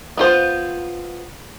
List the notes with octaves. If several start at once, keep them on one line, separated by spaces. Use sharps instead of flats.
B3 F4 C5